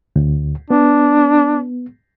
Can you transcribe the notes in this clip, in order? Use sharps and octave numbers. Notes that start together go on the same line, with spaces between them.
D2
B3 D4